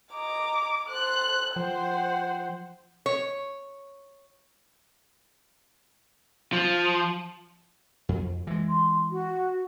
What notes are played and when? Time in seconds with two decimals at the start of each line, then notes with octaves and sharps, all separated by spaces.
0.13 D#5 A#5 D6
0.89 A4 C5 F#6
1.56 F3 C5 F#5 G5
3.06 C#5
6.53 F3
8.09 F2
8.47 E3 G#3
8.68 C6
9.10 F#4